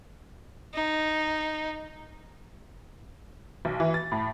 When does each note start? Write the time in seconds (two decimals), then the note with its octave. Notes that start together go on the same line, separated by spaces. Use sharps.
0.74 D#4
3.65 B1
3.80 E3
3.94 A6
4.12 A2